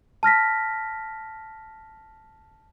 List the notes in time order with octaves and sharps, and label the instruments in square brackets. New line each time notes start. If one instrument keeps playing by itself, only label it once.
[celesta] A5 F6 A#6 B6